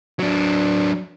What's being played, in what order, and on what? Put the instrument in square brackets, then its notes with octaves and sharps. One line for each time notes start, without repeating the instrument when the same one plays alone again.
[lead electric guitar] F#3 D4